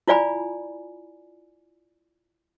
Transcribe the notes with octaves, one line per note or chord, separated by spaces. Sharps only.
E4 F4 D5 G#5 B5